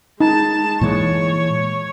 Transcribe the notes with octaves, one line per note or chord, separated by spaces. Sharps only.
G#3 D#4 A5
A#2 E3 G#3 C#5